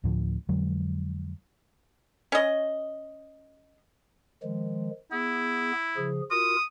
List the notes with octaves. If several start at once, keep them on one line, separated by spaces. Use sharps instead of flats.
D2 A2 D3 F3
F2 D3 F#3 G#3
C#4 D#5
D#3 F3 G#3
B3 E4 G#4
C#3 F3 G#4
F4 F#4 A#4 D#6